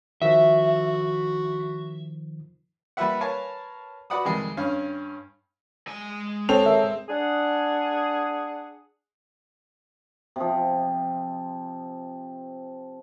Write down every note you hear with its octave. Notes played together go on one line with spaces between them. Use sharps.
D#3 F3 F#4 E5
G3 A#3 F4 B4 E5 F#5
A#4 B4 C#5 F5 G#5 A5
F#4 B4 D5 F#5 B5 D#6
F2 C3 D#3 G3 G#3
G2 C#4 F5
G#3 G#5
C4 A4 C#5 A5 F7
G#4 A#4 E5
D4 G#4 F#5
C3 F3